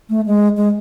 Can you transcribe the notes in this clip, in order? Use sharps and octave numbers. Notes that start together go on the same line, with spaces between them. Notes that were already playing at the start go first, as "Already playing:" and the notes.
A3
G#3
G#3